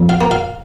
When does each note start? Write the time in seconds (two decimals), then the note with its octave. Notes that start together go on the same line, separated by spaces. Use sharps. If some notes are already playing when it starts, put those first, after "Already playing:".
Already playing: F2
0.09 F5
0.21 A#3
0.31 F5